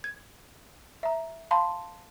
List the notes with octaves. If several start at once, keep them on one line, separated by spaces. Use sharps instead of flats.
G#6
E5 A#5
F5 A5 B5 C6